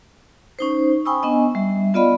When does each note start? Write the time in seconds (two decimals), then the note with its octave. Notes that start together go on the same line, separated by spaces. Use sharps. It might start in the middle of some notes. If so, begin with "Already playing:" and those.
0.59 C#4 D#4 C5
1.05 G5 G#5 B5 C#6 D#6 E6
1.23 B3 D4 D#5 G#5
1.55 G3 E5
1.94 B3 F4 D5 D#5 F5 B5